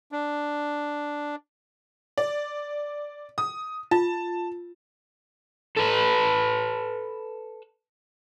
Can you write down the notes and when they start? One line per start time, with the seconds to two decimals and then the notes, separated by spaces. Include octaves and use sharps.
0.12 D4
2.18 D5
3.38 D#6
3.91 F4 A5
5.77 A4 B4